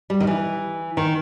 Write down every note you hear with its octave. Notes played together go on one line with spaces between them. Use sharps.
G3
D#3
E3
D#3